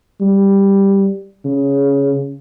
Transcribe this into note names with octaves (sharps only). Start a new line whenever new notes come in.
G3
C#3